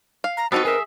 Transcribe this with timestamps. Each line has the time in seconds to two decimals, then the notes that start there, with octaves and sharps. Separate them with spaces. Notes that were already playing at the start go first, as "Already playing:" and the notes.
0.24 F5
0.37 A#5
0.52 B3 C4 D#4 F#4 A4 B4
0.65 G#4 A#4 E5